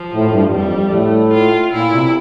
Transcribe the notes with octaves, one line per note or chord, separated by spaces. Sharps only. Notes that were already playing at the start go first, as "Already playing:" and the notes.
Already playing: F3
A2
G2
F2 G3
F2
G2
A2 A3
F4
A#2 E4
C3